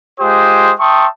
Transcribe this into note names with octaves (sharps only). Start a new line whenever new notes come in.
G#3 F4 G4 C5 D#6
E5 G5 A5 C6 C#6 D#6